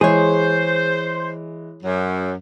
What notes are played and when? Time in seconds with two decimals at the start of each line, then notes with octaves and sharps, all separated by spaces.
0.01 E3 G#3 G#4 C5 C#5
1.83 F#2 F#3